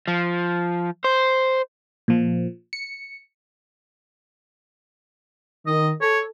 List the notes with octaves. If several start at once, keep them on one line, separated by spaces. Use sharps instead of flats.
F3
C5
A#2 F3
C#7
D#3 D#5
A4 C#5